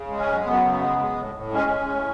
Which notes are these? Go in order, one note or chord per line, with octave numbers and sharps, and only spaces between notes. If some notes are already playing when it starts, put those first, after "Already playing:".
Already playing: C#3
G#3
C#4
F#2
F#2 B3
C#3
G#3
G#3
A2
A2
G#3 C#4
G#3
A2